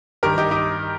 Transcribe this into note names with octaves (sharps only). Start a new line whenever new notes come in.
G2 D#3 G4 A#4
D#4 G4
D#4 G4